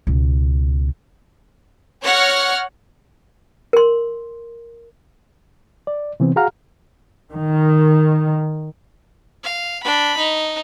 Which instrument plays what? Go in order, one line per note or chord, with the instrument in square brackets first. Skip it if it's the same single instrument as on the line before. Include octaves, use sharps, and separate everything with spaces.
[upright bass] C#2 B2
[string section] C#5 F#5 F6 A#6
[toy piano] A#4 C6
[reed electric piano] D5
C3 E3 B3 C4
F#4 G#4 F5 F#5 A#5 F6
[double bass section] D#3
[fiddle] F5
D4 B5
D#4